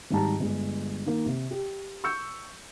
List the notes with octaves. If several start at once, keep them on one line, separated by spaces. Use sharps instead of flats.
G#1 G#2 G3 A5 A#5
G1 G#3
D#3 A#3
C3
G4
C#6 E6 G6 C#7